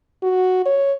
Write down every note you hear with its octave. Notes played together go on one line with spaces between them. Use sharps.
F#4
C#5